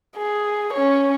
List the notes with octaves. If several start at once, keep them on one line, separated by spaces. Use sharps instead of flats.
G#4
C#4 C#5